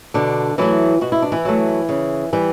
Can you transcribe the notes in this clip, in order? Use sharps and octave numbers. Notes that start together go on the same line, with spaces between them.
B2 D3 D4
E3 F#3 A3 E4
B2 F#4
E4
D4
E3 E4
F#3 A3
C#3
E3 G3